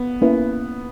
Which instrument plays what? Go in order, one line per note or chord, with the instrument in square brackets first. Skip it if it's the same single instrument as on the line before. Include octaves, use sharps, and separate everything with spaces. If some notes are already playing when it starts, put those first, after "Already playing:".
Already playing: [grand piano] B3
[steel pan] A#3 C#4 E4 B4